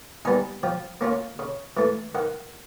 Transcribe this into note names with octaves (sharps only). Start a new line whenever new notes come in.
G3 B3 D#4 G#5
F3 G5
A#3 C#4 F4
C#3
E3 A3
D#3 F#5